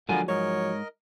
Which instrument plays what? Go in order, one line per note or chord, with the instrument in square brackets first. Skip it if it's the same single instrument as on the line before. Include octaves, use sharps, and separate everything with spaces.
[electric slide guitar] D3 G#5 [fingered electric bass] F3 F#3 G#3 [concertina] B3 F4 A#4
[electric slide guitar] G#2 [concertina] A#4 D#5 [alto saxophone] C#5